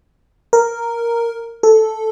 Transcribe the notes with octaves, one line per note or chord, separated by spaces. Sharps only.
A#4
A4